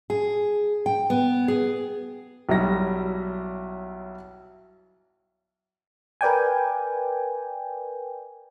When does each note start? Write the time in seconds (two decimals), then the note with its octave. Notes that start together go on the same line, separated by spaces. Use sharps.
0.10 G#4
0.86 G5
1.10 B3
1.48 G#4
2.49 B1 F#3 G3 E4 A#6
6.21 A#4 B4 D5 G5 G#5